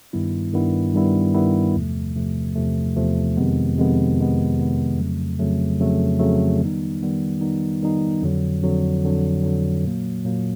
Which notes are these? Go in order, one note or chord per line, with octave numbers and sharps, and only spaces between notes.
G2 D#3 G3 B3 E4
G2 D#3 G3 B3 E4
G2 D#3 G3 B3 E4
G2 D#3 G3 B3 E4
E2 C3 F3 A3
E2 C3 F3 A3
E2 C3 F3 A3
E2 C3 F3 A3
F2 C3 D#3 G#3 B3
F2 C3 D#3 G#3 B3
F2 C3 D#3 G#3 B3
F2 C3 D#3 G#3 B3
F2 C#3 F#3 A3
F2 C#3 F#3 A3
F2 C#3 F#3 A3
F2 C#3 F#3 A3
D#3 G3 B3 D#4
D#3 G3 B3 D#4
D#3 G3 B3 D#4
D#3 G3 B3 D#4
F2 D3 F#3
F2 D3 F#3
F2 D3 F#3
F2 D3 F#3
A#2 F#3 A#3
A#2 F#3 A#3